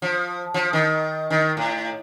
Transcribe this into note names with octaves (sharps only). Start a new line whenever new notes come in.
F3
F3
D#3
D#3
A2